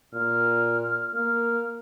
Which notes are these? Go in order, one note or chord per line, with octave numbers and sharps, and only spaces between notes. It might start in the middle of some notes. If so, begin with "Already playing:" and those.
A#2 F6
A#3 F6